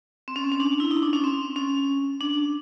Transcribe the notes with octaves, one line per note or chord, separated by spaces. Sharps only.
C4
C#4
C4
C#4
D4
E4
D#4
D4
C#4
C4
C#4
D4